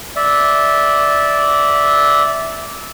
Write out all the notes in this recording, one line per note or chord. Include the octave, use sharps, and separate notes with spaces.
D5 E5